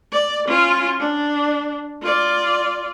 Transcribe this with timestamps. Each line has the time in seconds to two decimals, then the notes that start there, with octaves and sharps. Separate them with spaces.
0.12 D5
0.47 C#4 F4
1.00 D4
2.02 F4 D5